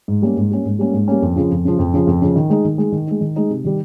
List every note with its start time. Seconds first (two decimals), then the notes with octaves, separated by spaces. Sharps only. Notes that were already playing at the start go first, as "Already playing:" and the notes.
0.08 G#2
0.22 G3 A#3 C#4
0.37 G#2
0.51 G3 A#3 C#4
0.65 G#2
0.79 G3 A#3 C#4
0.93 G#2
1.08 G3 A#3 C#4
1.22 F2
1.36 C#3 F3
1.51 F2
1.65 C#3 F3
1.79 F2
1.94 C#3 F3
2.07 F2
2.22 C#3 F3
2.36 D#3
2.50 G#3 D#4
2.65 D#3
2.78 G#3 D#4
2.92 D#3
3.07 G#3 D#4
3.21 D#3
3.36 G#3 D#4
3.50 C3
3.64 D#3 G3